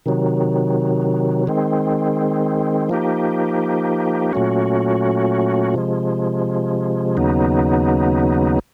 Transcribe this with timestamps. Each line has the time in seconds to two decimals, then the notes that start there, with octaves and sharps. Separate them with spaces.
0.06 C3 D#3 F#3
1.47 D#3 G#3 C4
2.89 F3 A#3 D#4 G4
4.33 A#2 F#3 A3 C#4 F#4
5.74 C3 F3 G#3
7.17 D#2 C#3 F#3 B3 D#4